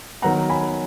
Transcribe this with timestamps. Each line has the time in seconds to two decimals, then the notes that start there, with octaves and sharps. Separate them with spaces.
0.22 D#3 F#3 B3 F#5 A#5
0.49 G#5 B5